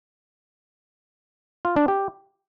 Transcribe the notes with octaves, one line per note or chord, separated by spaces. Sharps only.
F4
D4
G4